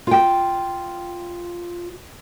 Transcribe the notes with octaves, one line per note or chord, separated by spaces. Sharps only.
F4 G5